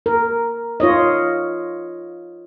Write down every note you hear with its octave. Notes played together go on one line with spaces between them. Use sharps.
A#4
F4 C#5 D#5